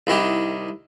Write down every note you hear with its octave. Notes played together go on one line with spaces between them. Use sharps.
C2 D#3 E4 G4